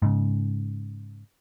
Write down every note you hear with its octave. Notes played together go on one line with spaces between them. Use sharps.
G#2 C#3